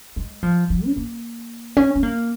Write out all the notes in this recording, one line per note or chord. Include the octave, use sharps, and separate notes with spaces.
G#3
F3
F3
C#4
A#3
C#4
C#4
A#3